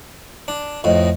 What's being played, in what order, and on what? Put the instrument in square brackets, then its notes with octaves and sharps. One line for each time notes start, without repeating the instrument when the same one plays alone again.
[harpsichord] D4
[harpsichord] F2 A2 [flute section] D#5